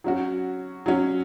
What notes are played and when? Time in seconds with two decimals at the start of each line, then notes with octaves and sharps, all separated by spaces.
0.04 F#3 C#4 F#4
0.86 F#3 C#4 F#4